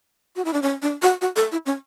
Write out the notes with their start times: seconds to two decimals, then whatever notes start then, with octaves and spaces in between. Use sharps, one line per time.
0.36 F#4
0.45 E4
0.53 D4
0.62 C#4
0.82 D4
1.02 F#4
1.21 F#4
1.36 A4
1.52 E4
1.66 C#4